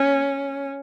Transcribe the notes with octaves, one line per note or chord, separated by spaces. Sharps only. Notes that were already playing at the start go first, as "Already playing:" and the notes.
Already playing: C#4